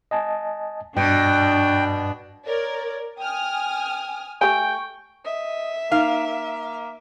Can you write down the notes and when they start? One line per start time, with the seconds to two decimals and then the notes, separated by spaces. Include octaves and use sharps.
0.11 D#5 G#5 A5
0.97 G2 B2 D4 G5
2.46 A#4 C#5 D5
3.18 G5 G#5 D#6 F6
4.41 A3 G4 G5 G#5 C#6
5.25 D#5 E5
5.92 A#3 D#4 F5
6.27 A#3